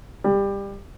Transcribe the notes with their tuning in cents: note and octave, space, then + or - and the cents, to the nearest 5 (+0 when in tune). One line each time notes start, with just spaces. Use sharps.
G3 +20